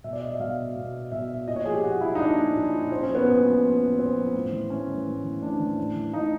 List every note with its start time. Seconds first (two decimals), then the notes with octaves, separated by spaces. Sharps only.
0.04 B2 E5
0.13 D5
0.21 D#5
0.31 E5
0.39 B2 F5
0.76 B2
1.12 B2 E5
1.48 A#2 D#5
1.56 C#5
1.65 F3 G#4
1.74 G4
1.83 A#2 F#4
2.01 F3 E4
2.15 D#4
2.19 A#2 D4
2.38 F3
2.55 A#2
2.73 F3
2.91 A#2 C4
3.03 C#4
3.09 F3
3.15 B3
3.27 A#2
3.44 F3
3.63 A#2
3.81 F3
3.98 A#2 C4
4.16 F3
4.34 A2
4.52 E3
4.70 A2 C#4
4.88 E3
5.06 A2
5.24 E3
5.42 A2 D4
5.60 E3
5.77 A2
5.95 E3
6.13 A2 D#4